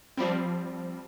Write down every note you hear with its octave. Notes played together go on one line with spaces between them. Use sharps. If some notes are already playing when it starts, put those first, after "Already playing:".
F3 G3 C4